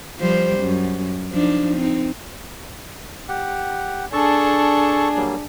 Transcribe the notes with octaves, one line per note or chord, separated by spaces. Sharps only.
F3 G3 C5
F#2
F3 D4 D#4
C4 D#4
G4 F#5
D4 G#4 A4 A5 C#6
F#3 G3 A#3